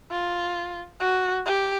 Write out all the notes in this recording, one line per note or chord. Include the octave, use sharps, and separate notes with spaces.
F4
F#4
G4